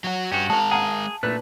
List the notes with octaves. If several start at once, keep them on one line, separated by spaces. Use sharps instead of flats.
F#3 F#4
G2 C#4 F#4 G4
G#3 A#4 A5
G#4 F5 F#5 A#5
A#2 A3 B4 F#6